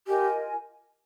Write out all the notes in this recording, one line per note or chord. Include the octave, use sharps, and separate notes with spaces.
F4 G4 A#4 D#5 G#5